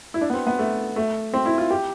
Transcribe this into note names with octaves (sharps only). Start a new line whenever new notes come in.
E4
D4
B3
C4
B3
A3
A3
C4
E4
F4
G4